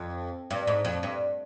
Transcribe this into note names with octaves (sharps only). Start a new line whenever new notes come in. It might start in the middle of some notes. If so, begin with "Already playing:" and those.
Already playing: F2
G2
G#2
F2
G2